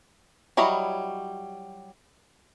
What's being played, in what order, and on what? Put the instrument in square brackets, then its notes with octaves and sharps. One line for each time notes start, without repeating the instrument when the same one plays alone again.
[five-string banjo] F#3 G3 E4 C#5 D#5